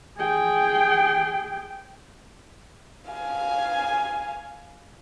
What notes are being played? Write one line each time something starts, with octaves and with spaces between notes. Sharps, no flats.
G#4 G5
F5 G#5